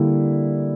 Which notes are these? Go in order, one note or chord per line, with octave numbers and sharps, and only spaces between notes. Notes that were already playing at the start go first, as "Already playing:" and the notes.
Already playing: D3 G3 A#3 E4